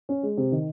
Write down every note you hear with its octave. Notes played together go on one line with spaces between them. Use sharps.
C#4
G#3
C3
D#3